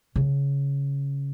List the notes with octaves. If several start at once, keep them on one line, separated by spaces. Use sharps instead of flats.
C#3